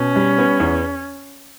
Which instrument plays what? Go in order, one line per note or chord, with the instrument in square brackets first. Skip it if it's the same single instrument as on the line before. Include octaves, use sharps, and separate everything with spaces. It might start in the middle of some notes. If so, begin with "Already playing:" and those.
Already playing: [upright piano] B2 [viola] C#4
[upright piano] G3
B3
E2